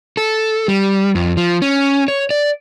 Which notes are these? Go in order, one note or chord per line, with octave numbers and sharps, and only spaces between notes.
A4
G3
F2
F3
C#4
C#5
D5